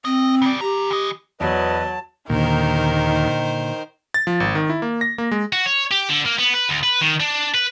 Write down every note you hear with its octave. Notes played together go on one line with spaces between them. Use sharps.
C4 D#5
C#3 D5
E3 G4 A#5
E3 D#5
E2 F#3 B4 D#5 A5
D#2 A#2 D3 D#3 A#4 C5
A6
F3
G#1
D#3
E4
A#3
A#6
A#3
G#3
F#4
C#5
G4
D3
A#3
B3
B4
D2
B4
D#3
D4
B4